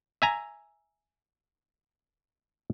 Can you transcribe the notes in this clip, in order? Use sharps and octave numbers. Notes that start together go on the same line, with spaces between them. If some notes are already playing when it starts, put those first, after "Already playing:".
E5 G#5 A#5